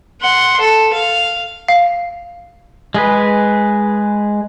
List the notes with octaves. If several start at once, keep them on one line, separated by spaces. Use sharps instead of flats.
F#5 C6
A4
F5
F5
G#3 G#4 B4